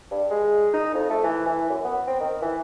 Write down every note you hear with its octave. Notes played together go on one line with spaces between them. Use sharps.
G2
G#3
D#4
F2
A3
E3
E3
F#2
B3
C4
D#3
E3